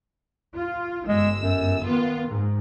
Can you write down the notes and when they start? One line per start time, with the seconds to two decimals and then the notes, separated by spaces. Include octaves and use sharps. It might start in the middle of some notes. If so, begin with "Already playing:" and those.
0.56 F4
1.07 G1 G#3 E6
1.42 F#2
1.85 D#3 B3 F4
2.28 G#2